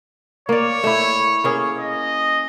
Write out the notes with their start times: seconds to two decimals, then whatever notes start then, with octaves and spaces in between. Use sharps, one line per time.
0.49 A#3 C#5 D5
0.84 A3 E4
1.44 A#3 C#4 G#4
1.79 D#5